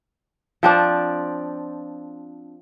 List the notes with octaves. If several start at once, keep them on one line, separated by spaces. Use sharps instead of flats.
F3 C4 D4